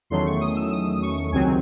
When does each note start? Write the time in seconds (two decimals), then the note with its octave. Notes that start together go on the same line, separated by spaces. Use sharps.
0.10 E2 D#3 F#3 A3 C#4 C6
0.26 C#6
0.40 D#6
0.56 E6
0.71 D#6
1.02 C#6
1.32 C#2 C3 D#3 F#3 C4 G#5